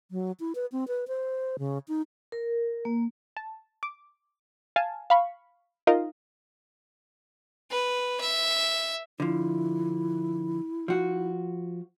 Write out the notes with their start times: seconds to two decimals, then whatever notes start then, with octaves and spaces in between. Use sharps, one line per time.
0.11 F#3
0.40 E4
0.55 B4
0.72 C4
0.88 B4
1.08 C5
1.59 C#3
1.88 D#4
2.32 A#4
2.85 A#3
3.37 A5
3.83 D6
4.76 F5 G#5 A5
5.10 F5 B5 C#6
5.87 D#4 F4 A#4 D#5 F5
7.70 B4
8.20 E5
9.20 D3 F3 E4
10.88 F3 F#4